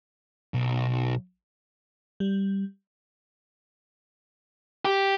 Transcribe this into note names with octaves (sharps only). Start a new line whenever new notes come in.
B1
G3
G4